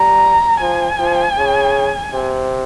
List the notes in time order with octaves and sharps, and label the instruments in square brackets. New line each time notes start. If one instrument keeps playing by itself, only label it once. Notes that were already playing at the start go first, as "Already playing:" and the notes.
Already playing: [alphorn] G3 [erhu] A#5
[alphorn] F3 [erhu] G#5
[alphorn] F3
C#3
C3